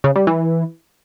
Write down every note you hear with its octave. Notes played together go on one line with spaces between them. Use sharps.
C#3
G3
E3